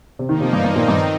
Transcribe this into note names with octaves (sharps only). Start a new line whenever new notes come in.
C3
D#3 F3 A#3 D#4
C3
G2
G2 D#3 C4 D#4
A#2
G2